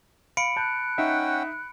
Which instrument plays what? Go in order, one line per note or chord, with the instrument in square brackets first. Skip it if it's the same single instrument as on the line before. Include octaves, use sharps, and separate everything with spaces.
[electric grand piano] F5 [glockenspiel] B5 C#7 D7
[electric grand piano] A5 G6 [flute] F#6
[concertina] C#4 F#5 G5 [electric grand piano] D#4 E5